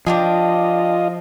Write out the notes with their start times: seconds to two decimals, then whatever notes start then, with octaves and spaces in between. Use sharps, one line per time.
0.07 F3 D4 F4 G4 G#4 D#5